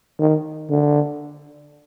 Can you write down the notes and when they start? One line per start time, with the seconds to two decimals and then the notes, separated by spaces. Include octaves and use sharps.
0.20 D#3
0.70 D3